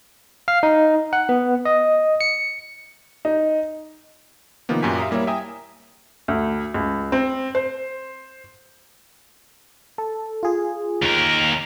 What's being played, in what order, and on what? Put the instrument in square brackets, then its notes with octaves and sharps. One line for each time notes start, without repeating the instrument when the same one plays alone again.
[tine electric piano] F5
D#4
F#5
B3
D#5
C#7
[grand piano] D#4
[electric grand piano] C3 D#3 F3 A#3 B3
F#2 A#2 F#4 G4 G#5 B6
E5 F5 A#5 D#6
G3 A#3 E4 C#5 E5
E5 G5 G#5 A#5 D#6
[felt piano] D2
C#2
C4
C5
[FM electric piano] A4
F4 G#4
[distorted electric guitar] D#2 A#4